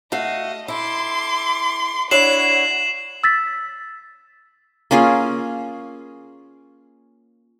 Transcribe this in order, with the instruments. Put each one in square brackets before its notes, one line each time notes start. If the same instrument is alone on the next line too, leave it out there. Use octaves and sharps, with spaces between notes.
[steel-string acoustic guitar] A3 F#4 F5 [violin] D#5
[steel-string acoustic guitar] E4 A4 [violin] C6 D6
[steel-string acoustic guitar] D4 E4 C#5 [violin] F#4 [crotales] C7 E7 F#7
[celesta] E6 A6 B6
[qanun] A#3 C#4 F4 G#4